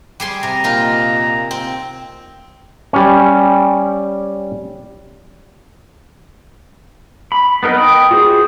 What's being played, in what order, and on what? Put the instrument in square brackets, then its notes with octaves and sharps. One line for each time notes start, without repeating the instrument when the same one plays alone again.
[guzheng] G3 G#4 C6
[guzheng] C3 [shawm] A#5
[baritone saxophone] A#2 [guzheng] D#4 F4
[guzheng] C4
[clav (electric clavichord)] G3 C#4
[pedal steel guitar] B5
B3 D#4 A#4 B4 D#5
G5 B5 D#6
F4 F#4 G#4 C5